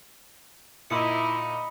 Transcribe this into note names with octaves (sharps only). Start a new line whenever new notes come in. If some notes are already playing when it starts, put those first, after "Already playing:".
A#2 D#4 E4 D#5 B5 C6 D#6 C#7